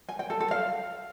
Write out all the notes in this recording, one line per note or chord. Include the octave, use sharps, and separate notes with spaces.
G#5
G5
A4
A4
F5